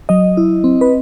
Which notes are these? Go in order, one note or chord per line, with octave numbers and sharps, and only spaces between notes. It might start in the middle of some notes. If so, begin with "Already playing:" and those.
F#3 D#5
E4
C4
B4